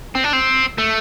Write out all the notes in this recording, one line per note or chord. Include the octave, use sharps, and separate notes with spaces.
C4
D4
C4
A3